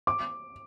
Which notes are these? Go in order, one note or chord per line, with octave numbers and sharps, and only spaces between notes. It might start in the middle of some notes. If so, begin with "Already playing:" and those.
D6